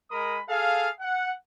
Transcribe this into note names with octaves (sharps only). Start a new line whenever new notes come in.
G#3 A#4 B5 D#6
G#4 A4 F5
F#5